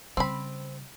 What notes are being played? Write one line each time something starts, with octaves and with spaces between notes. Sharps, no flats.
C#3 G3 C4 B5